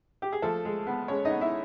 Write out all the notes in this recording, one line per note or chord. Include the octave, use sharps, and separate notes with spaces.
G4
G#4
F3 A3 A4
G#3
B3
G#3 C#4 C#5
D#4 D#5
B3
E4 E5